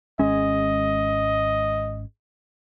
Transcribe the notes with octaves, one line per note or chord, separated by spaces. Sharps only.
G#1 G#3 C#4 D#5